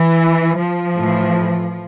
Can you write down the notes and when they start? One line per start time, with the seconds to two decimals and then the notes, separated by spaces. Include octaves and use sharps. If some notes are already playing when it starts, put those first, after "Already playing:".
Already playing: E3
0.57 F3
0.95 A2 E3